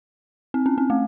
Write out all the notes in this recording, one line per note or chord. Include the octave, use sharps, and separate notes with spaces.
C4
C#4
C4
A3